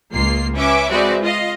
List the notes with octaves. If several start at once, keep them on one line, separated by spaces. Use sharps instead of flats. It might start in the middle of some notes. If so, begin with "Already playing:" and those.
C#2 A#3 F4 C7
C#4 B4 E5 D6
G#3 C4 F#4 B4 D5 E5
F4 D#5 F5